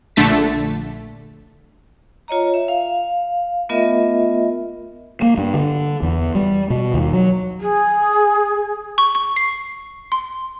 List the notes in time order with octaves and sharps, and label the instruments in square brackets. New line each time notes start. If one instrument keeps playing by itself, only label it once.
[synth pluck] A#1 D3 A3 A5 B6
[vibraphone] F4 C#5 D#5 A#5
E5
F5
A3 B3 F4 A#4 D#5 E5
[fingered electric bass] A#3
G2
D3
E2
G3
B2
D#2
F#3
[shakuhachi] G#4
[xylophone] C#6
C#6
C7
C6